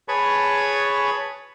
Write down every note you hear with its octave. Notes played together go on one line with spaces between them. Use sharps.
G#4 B4 C#5 A5 B5 C#6